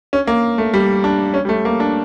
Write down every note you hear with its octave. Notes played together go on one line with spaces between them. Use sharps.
C#4
A#3
A3
G3
D4
C#4
G3
A3
A#3
D4